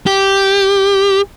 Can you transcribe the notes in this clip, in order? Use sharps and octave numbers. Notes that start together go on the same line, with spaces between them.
G4